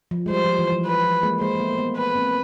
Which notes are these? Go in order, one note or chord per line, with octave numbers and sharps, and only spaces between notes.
F3
G#3
G3 C5
F3
E3
F3
B4
F3
G#3 A#3
G#3 A#3 C5
A#3
A3 B3
A#3
A3 B3
B4
A#3 C4